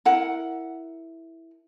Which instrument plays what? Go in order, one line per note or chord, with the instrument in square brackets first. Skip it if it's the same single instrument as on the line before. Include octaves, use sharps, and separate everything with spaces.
[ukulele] E4 A#4 F#5